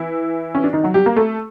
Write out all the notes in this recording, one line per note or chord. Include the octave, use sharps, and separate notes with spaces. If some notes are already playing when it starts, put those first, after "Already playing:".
Already playing: E3 E4
C#4
D4
D#3 D#4
F#3 F#4
G3 G4
A#3 A#4
A3 A4